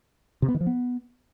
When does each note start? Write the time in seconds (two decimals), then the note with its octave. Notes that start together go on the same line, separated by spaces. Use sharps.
0.42 C3
0.48 B3
0.54 D#3
0.61 F3
0.67 B3